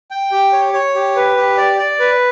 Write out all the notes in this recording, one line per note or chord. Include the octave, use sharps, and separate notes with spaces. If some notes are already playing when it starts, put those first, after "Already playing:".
G5
G4
C#5
C#5
G4
B4
G4
D5
D5
B4